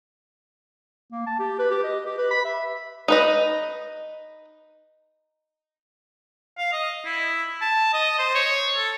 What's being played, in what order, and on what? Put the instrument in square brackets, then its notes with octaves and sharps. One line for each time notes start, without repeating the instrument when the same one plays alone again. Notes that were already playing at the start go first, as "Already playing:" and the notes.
[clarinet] A#3
A5
G4
B4
G4
D#5
G4
B4
B5
E5
[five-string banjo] D#4 B4 D#5
[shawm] F5
D#5
E4
A5
D#5
C5
C#5
A4